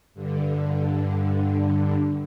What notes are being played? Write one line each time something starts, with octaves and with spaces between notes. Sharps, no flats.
G2 D3